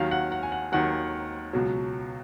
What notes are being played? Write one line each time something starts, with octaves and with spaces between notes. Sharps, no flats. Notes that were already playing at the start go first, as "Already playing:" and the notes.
Already playing: D#2 D#3 F#3 F5
F#5
F#5
G#5
F#5
D#2 D#3 F#3 F#5
C#2 B2 F#3